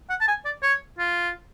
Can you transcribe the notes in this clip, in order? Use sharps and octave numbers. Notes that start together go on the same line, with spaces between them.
F#5
A5
G#5
D5
C#5
F4